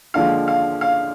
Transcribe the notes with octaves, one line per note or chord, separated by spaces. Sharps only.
D#2 D3 F3 G#3 F5
F5
F5